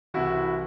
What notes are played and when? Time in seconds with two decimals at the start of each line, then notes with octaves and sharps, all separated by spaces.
0.14 C2 C3 E3 E4 F#4